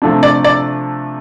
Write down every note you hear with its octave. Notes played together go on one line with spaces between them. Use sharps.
C3 F3 A3 D4
D5
D5